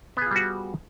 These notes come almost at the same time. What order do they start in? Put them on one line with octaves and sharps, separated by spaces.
B3 G#4 F4 G3 F#4